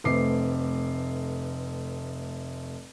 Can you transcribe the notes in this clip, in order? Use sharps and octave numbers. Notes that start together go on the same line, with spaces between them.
F1 A3 C4 B4 D6 C7